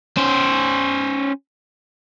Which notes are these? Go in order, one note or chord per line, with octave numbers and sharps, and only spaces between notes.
C#4 C5